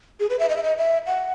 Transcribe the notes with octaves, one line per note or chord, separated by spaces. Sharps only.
G#4
B4
E5
D#5
E5
D#5
E5
F#5